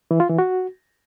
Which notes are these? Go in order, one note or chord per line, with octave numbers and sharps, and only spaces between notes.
E3
F4
E3
F#4